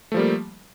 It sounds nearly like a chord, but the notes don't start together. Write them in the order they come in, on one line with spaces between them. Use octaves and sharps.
A3 F3 G3 A#3